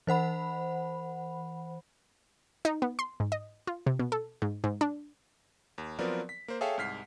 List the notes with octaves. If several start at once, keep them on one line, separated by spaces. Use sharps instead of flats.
E3 C5 F#5 B5
D#4
B3
C6
G#2
D#5
F4
C3
B2
A4
G#2
G#2
D4
D#2
F3 F#3 B3 C4 A#4 D5
B6
A#3 C5
G#4 A4 C#5 E5 F5 G5
C2 G#2 F6 B6 C7